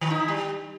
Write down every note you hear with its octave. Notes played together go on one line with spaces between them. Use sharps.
D#3
D#4
E4
G3